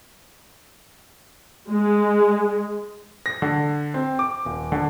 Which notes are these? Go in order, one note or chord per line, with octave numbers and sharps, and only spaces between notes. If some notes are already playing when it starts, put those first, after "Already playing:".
G#3
A#6
D3
C4
D6
D#1
D3